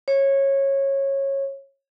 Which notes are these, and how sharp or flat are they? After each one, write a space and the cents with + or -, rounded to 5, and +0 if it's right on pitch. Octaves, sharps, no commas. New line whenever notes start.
C#5 -15